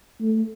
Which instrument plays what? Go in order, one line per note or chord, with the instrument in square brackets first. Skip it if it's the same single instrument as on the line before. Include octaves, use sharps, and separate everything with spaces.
[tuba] A3